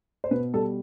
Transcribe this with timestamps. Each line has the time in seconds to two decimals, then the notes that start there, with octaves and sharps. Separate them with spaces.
0.24 C5
0.31 B2 B4
0.53 G3 A4